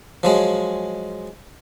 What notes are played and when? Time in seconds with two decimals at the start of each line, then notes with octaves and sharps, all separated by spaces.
0.23 F3 F#3 G#3